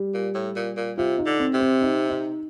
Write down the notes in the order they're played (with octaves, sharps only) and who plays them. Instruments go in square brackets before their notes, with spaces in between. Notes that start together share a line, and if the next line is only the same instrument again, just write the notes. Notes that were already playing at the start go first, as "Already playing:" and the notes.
Already playing: [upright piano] G3
[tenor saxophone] A#2
A2
A#2
A#2
[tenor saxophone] C3 [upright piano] F4
[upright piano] D#4
[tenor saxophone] D3
[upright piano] C4
[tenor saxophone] C3
[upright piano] C4
D#4
D#4